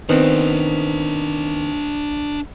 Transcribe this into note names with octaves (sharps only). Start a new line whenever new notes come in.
D#3 B3 C4 D4 C5